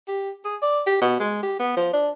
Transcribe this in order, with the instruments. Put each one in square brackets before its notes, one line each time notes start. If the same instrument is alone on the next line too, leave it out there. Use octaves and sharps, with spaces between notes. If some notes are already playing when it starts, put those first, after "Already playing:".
[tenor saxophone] G4
G#4
D5
G4
B2
G#3
G4
B3
F3
D4